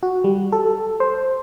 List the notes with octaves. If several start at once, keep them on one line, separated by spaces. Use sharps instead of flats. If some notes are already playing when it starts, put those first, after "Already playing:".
F#4
G3
A4
C5